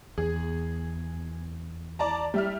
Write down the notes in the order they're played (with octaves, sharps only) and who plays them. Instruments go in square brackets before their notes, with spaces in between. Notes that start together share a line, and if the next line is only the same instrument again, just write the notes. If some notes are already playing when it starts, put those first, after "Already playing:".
[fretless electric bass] E2 [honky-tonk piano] G#4
[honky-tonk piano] D5 A5 A#5
G3 E5 F6